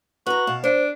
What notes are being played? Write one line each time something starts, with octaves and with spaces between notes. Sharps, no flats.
F#4 B4 A#5
B2 F5 A5
D4 C5